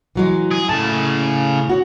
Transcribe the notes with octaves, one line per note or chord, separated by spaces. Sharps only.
E3 F#3 G#3
G#4
A2 C#3 A5
F#4 C#5